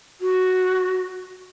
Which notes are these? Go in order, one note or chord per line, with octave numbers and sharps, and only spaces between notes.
F#4